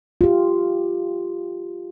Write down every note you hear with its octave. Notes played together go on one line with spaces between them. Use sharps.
F4 G4